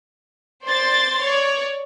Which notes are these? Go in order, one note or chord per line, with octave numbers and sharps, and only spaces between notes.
C5 D5 C6 A6
C#5 D5